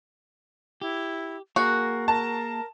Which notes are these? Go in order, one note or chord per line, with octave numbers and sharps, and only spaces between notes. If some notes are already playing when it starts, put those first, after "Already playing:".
E4 G4
A#3 F#4 G#4 A#4
A#4 A5